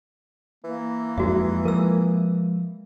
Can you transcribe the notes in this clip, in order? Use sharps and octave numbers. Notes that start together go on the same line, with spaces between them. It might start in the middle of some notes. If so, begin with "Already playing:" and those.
E3 A#3
F2 G#3 D#4 F#4 E5
F3 G#3 A#4 E6